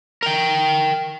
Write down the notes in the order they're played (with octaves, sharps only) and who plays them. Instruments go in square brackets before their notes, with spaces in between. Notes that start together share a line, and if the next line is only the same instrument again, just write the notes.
[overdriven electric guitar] A#4 G5